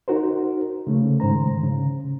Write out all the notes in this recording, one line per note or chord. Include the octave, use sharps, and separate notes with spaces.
D#4 F#4 A#4 C5
C#3 A3
G#2 D#3 C5 A#5
C#3